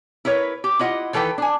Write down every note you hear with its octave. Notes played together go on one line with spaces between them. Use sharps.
E4 A#4 B4 C#5
G4
E4 F4 D#5 F#5
D#3 E3 A4 B4 G5
D4 G#5